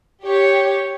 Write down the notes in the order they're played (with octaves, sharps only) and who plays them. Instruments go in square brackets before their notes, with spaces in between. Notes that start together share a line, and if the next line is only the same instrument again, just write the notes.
[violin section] G4 C#5